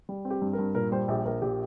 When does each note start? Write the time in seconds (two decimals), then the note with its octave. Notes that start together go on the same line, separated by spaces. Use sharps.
0.09 G3
0.25 C4
0.30 G4
0.42 G2
0.53 A#4
0.58 G2
0.75 A#2 A#4
0.92 G3 C5
1.08 A#1 G4
1.25 A#1 A#4
1.42 A#2 G4